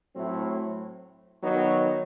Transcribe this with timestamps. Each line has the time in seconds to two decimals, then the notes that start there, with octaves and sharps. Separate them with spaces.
0.15 A2 F#3 A3 C4
1.42 D#3 F#3 B3 D#4